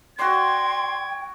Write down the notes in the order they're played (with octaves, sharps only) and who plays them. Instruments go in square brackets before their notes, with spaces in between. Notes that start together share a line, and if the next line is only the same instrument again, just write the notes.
[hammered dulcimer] F#4 D5 [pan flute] G5 [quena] C6 [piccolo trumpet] G#6